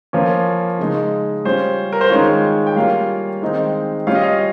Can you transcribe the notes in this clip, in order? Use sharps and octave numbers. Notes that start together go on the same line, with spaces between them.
F3 A#3 C#4 F4
C#3 G#3 D#4
G3 C#4 F4 C5
A#4
C5
D#3 G#3 C#4 F4 C#5
G5
G3 A#3 C#4 F4 F5
D#3 G#3 C4 D#4
G3 C#4 F4 F5
D#5
F5